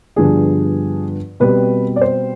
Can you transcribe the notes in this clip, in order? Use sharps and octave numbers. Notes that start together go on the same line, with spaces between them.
G2 D3 F3 B3 D4 G#4
B2 G3 C4 B4
D5
C5